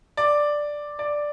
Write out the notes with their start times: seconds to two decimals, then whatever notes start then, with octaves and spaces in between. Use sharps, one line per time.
0.17 D5
0.99 D5